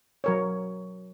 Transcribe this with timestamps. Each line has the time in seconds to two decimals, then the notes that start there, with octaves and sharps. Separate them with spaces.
0.24 F#3 A#4 C#5